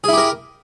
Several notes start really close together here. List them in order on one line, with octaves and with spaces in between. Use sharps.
G#4 E4 G4 A#4